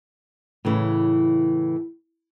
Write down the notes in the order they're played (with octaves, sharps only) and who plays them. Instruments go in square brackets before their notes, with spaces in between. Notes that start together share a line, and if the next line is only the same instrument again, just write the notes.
[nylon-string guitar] A2 C#3 E3